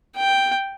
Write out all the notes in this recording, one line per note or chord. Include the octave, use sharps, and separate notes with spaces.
G5